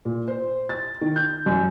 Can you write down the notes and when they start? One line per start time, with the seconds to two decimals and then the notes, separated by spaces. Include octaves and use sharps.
0.05 A#2
0.28 C5
0.69 A6
1.01 D#3
1.16 G6
1.46 F#2